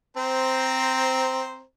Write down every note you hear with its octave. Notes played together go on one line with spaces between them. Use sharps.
C4 C5 A#5